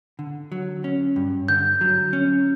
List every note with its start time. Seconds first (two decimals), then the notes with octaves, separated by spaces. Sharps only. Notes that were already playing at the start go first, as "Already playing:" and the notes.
0.19 D3
0.52 F#3
0.84 C#4
1.16 G2
1.49 D3 G6
1.81 F#3
2.13 C#4